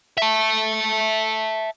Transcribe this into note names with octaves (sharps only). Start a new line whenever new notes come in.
E5 A5